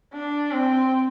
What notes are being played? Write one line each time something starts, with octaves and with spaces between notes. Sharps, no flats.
D4
C4